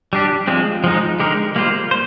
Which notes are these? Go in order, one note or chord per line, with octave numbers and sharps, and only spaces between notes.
G3 D4 G4
F3 G#3 C4
F3 G#3 D#4
D3 G#3 D#4 G4 A#4
G3 A#3 F4 C5
C5